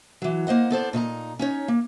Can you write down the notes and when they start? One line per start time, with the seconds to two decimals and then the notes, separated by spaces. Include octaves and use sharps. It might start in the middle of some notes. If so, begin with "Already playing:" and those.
0.22 E3 F#3
0.47 A#3 C5 D#5 F#5
0.71 B3 A4 C5 D5
0.93 A#2 D#4 D#5 A#5
1.39 C#4 D#4 C#5
1.68 A#3